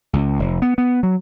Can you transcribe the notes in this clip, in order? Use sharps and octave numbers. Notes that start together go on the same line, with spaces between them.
C#2
F1
B3
B3
F#3